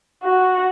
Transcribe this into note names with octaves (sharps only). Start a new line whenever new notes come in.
F#4